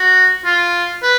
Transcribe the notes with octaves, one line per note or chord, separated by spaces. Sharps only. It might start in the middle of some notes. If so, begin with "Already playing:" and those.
Already playing: F#4
F4
B4